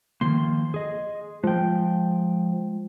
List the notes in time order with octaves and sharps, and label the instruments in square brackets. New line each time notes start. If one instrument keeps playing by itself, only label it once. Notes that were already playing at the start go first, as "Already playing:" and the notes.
[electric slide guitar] D#3 F3 A#3 [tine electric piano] C6
[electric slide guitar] G#4 D#5
[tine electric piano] F3 [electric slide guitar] G#3 G5